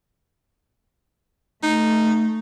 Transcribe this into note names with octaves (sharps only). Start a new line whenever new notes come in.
A3 D#4